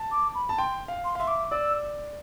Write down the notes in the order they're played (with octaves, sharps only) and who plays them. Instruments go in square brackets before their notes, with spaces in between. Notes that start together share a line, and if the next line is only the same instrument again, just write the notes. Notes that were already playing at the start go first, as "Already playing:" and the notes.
Already playing: [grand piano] A5
[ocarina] D6
B5
[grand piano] A5
[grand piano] G5 [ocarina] C6
[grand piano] F5
[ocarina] C6
[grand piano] F5
[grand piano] E5 [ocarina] C6
[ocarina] D6
[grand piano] D5 [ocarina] E6